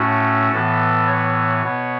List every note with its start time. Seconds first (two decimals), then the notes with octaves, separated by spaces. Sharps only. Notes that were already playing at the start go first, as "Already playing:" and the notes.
Already playing: A2 A3 C#4 F#4
0.52 A2 E3 B3 A4
1.07 C#5
1.63 B2 B3